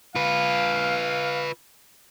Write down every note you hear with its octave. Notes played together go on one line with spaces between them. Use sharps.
F4 B4 F5